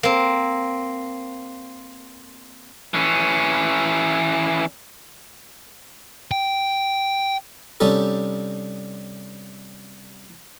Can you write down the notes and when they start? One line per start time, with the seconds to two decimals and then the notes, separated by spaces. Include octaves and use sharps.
0.03 A#3 C4
2.94 E3 C#4
6.31 G5
7.80 C3 G3 C#4 D#4 G4 A4